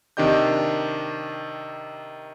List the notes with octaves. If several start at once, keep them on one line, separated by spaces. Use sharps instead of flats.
C3 D#3 D4 G4 D#5 G6